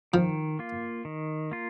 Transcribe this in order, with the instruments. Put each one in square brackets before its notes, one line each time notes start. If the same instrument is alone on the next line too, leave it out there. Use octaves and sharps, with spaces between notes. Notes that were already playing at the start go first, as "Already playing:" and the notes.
[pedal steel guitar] D#3 [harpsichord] F3
[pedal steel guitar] A#3 F4
D#3
A#3 F4